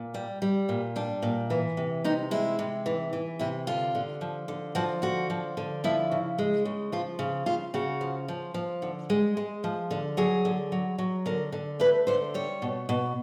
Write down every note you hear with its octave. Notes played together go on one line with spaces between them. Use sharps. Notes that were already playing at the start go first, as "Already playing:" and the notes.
Already playing: A#2
G3
G3
A#2
G3 D4
A#2
E3
C3
C3 D#4
G#3 E4
C3
E3
E3
C3 E4
D3 F4
D3
F3
D3
F3 F#4
D3 F#4
F3
D3
F3 E4
C#3
G#3
C#3
F3 F4
C#3
C#3 F4
C#3 F#4
F3
F3
F3
D3
G#3
G#3
F3
D3
F#3 G#4
D3
F#3
F#3
D3 A#4
D3
A3 B4
D3 C5
G3 C#5
B2
B2